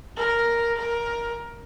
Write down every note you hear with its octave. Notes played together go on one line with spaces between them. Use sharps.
A#4
A#4